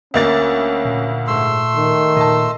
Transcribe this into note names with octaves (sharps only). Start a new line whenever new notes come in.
D2 A#3 C#4 A6
A#2
G#2 A3 C6 E6
D#3
A#2 D#5 A5